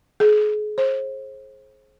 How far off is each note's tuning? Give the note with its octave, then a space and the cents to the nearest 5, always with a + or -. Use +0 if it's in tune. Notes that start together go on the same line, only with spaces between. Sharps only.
G#4 +35
C5 +35